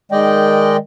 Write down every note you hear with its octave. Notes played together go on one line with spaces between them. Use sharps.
D#3 G#3 D5 D#5 G5